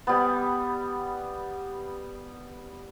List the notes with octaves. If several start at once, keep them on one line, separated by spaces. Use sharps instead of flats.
G3 B3